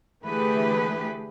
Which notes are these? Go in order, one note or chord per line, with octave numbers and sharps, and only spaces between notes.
D3 E3 A3 G4 G#4 B4